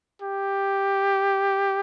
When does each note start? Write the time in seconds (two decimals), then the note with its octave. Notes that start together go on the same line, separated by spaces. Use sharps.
0.22 G4